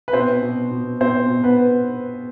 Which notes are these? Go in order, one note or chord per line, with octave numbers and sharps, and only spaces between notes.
B4
B2 C4 C5
B2
B2
B2 C4 C5
B2
B3 B4